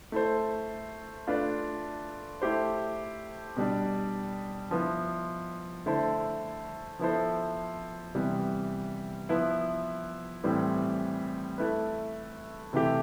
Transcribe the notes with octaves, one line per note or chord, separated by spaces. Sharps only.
A3 E4 A4 C5
A3 D4 F4 B4
A3 E4 G4 C5
B2 G3 D4
F3 B3 E4
D3 A3 E4 A4 C5
F3 B3 E4 A4 C5
C3 E3 G3 B3
F3 B3 E4 B4
A2 E3 G3 C4
A3 E4 B4
C3 E3 A3 E4 G4